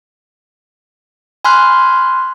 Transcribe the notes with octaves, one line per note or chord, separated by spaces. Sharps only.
G#5 B5 C6 F6 F#6